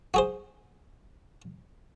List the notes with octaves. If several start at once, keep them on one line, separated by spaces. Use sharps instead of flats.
F#4 G#4 C5